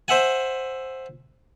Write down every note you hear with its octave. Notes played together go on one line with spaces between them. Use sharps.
C5 E5 F#5 G#5